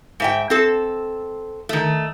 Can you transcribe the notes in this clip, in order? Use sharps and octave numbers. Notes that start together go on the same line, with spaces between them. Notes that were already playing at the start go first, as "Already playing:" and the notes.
G#2 E5 G5
C4 A4
D#3 A3